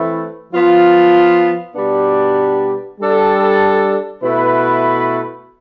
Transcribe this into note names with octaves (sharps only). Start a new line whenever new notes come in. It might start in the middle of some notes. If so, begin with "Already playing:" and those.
Already playing: E3 A3 C4 E4 B4
F3 B3 F4
B2 G3 B3 D4 G4
G3 D4 A4
B2 A3 E4 B4